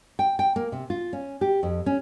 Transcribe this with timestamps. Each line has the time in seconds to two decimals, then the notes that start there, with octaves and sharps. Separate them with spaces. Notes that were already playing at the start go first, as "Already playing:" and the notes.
0.19 G5
0.39 G5
0.56 A#3
0.72 C3
0.90 F4
1.13 C#4
1.41 G4
1.63 F2
1.86 C#4